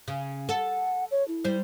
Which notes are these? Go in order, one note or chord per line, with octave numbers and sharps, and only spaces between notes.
C#3
A4 F#5
C#5
E4
G3 C5